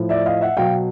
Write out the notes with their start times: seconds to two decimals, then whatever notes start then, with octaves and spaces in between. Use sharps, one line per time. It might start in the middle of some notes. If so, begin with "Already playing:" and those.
Already playing: A2 F3
0.09 D5 E5
0.26 D#5 F5
0.41 E5 F#5
0.57 B2 F#3 F5 G5